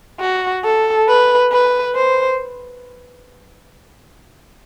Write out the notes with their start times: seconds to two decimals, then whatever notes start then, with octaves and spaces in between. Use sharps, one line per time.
0.20 F#4
0.65 A4
1.08 B4
1.52 B4
1.95 C5